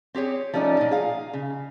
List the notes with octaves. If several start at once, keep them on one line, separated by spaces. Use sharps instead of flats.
C4 G4 G#4 C#5
F3 G3 A3 C#4 D#4 D5
A#2 D#4
G#4 F5
C#3